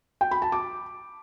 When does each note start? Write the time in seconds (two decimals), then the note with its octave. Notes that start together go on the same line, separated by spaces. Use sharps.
0.21 G5
0.31 B5
0.42 A5
0.52 D6